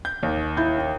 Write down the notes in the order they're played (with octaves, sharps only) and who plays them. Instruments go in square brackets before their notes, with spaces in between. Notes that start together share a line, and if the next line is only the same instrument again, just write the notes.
[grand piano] G6
D#2
[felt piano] E4 G6
G5